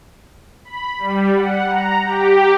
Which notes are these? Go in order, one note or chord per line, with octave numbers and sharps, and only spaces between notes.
B5
G3
F#5
A#5
G4